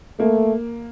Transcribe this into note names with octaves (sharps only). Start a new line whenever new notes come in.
A3 A#3